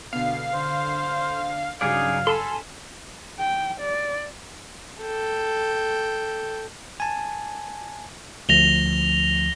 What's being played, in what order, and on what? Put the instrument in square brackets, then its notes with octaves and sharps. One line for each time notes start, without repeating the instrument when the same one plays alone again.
[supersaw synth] B2 D3 B3 [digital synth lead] F5
[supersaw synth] D3 [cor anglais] C5
[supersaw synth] G2 C#3 F#3 [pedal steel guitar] D#4 G#4 D5 [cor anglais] F5
[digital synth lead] A4 [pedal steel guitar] G#5 A5 C6 [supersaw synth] B5 F6
[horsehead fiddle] G5
D5
[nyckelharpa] A4 G5
[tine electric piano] G#5 A5
[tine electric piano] D2 F3 [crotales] A#6 F7 G7